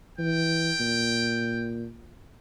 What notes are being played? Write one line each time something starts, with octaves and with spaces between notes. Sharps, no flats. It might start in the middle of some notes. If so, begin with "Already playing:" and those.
E3 G5
A#2